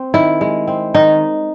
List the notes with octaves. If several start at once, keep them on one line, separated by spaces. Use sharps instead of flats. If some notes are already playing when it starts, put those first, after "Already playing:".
Already playing: C4
D#3 E4
G#3
C4
D#3 D#4